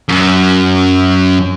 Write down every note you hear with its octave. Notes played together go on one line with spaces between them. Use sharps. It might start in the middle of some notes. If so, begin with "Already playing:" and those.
F#2